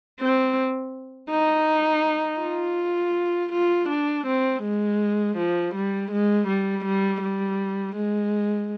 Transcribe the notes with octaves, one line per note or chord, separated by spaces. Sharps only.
C4
D#4
F4
F4
D4
C4
G#3
F3
G3
G#3
G3
G3
G3
G#3